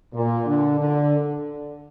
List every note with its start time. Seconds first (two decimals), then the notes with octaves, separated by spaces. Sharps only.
0.14 A#2
0.46 D3
0.79 D3